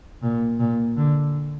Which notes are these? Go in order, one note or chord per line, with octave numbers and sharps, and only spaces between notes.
A#2
A#2
D3